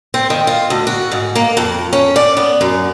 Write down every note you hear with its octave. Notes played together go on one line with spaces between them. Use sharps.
C4
D#3
F4
D2
F#4
G#2
A#3
F2
C#4
D5
B3
F#2